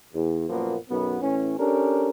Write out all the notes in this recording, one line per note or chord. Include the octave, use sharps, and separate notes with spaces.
E2
F#2 A#2 F3 A#3 B3
B1 F#2 B3
A2 E3 C#4
C#4 D4 G4 A4 A#4